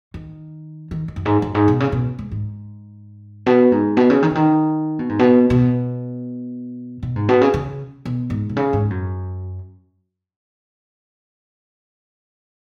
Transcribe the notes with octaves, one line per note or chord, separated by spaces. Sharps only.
D#3
D#3
D#3
F#2
G#2
F#2
G#2
B2
C#3
B2
G#2
G#2
B2
G#2
B2
C#3
D#3
C#3
D#3
B2
G#2
B2
B2
B2
G#2
B2
C#3
C#3
B2
G#2
B2
C#3
G#2
F#2